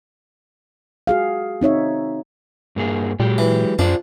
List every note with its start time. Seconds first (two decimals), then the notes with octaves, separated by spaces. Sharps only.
1.07 F#4 G#4 F5
1.61 C4 D#4 C#5 E5
2.76 G2 A#3 G#4
3.20 A#2 F#3 G#3 G4
3.38 E3
3.79 F#2 D4 F4 C5 D5